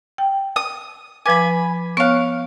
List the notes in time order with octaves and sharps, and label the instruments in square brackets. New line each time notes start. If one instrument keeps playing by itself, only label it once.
[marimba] G5
[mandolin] D#6
[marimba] F3 B4 D6 [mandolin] G#5 B5
[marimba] B3 C#5 F#6 [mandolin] F5 C#6